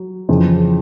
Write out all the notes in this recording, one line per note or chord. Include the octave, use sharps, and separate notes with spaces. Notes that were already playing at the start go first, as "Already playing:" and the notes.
Already playing: F#3
F2 C#3 E3